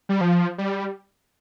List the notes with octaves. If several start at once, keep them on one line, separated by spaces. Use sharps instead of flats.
G3
F3
G3